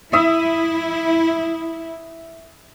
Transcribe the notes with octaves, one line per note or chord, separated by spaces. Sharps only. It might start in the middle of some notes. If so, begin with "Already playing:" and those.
E4 E5 D#6